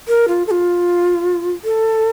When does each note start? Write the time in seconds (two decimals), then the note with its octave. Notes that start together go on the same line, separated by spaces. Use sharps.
0.08 A#4
0.28 F4
0.47 A4
0.51 F4
1.64 A4